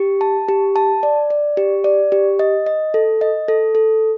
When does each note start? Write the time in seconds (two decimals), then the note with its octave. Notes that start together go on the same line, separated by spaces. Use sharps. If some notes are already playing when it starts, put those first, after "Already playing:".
Already playing: G4
0.21 A5
0.49 G4
0.76 A5
1.03 D5
1.30 D5
1.57 G4
1.84 D5
2.12 G4
2.39 D#5
2.66 D#5
2.94 A4
3.21 D#5
3.48 A4
3.75 A4